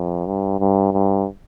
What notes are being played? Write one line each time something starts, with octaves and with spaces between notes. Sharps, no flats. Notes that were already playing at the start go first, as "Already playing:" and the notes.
Already playing: F2
G2
G2
G2